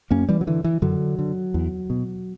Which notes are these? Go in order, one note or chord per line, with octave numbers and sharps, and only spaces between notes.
F#2 A#3 C#4
E3 G3
F#3
D3 E3
E3
F#2 D3 F#3
D3
E2
B2